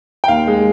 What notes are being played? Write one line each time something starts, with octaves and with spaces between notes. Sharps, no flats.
G5
D#2 F5
G#3